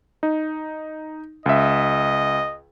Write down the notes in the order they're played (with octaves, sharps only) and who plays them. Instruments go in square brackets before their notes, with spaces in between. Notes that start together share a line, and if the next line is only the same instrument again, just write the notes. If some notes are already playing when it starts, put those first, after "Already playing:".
[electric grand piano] D#4
[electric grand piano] C#2 E5 [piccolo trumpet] D#5